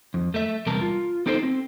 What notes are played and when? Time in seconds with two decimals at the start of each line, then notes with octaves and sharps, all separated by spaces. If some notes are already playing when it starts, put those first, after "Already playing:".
0.14 F2
0.34 A3 E5
0.66 E2 C3 G3 A#4 A5
0.81 F4
1.26 B3 D#4 G4 A4 C5
1.43 C4